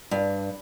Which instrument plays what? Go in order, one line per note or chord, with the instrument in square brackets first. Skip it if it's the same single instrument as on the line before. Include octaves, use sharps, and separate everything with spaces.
[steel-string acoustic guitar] G2